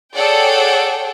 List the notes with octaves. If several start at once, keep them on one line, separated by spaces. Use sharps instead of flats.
G#4 A4 C#5 D5 F#5 G5